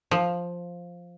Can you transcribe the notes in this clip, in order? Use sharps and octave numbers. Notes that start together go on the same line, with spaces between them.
F3